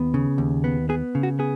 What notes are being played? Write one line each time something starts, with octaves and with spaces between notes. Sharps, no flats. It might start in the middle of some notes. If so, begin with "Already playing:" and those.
Already playing: D#2 B3
C#3
D#2
B3
B3 G#4
C#3
F#4
B3 G#4